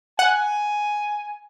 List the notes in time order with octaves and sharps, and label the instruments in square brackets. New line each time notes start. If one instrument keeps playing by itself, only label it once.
[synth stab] F#5 [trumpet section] G#5